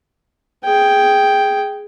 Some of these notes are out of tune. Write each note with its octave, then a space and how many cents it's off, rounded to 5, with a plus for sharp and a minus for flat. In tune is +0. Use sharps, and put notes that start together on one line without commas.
G#4 +0 G5 +0